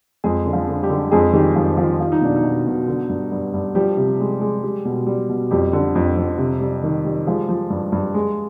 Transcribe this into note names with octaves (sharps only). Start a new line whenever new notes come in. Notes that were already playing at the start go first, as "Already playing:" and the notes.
F2 G#3 G#4
D3
F3 F4
D3
G3 G4
D3
F2 G#3 G#4
D#3 G3 G4
F2 F3 F4
D#3 F3 F4
G3 F4
D#4
B2 D4
D#4
B2
B2
D3
G2
G2
G2
F3 G3 G4
C3
G#3
G#3
G3
B2
G3
B2
F2 G3 G4
D3
F2
F2
C3
G3
D#3
G3
F3 G#3 F4
F3
G2
G2
G#3